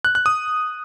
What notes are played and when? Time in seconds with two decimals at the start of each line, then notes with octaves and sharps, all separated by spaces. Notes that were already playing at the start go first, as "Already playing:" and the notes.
0.05 F#6
0.15 F#6
0.26 D#6